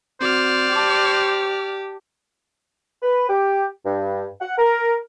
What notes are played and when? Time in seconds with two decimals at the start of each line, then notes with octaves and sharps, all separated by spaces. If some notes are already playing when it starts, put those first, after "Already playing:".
0.21 C4 F#4 C5 D5 F6
0.73 G4 A5 D6
3.03 B4
3.29 G4
3.85 G2
4.41 F#5
4.58 A#4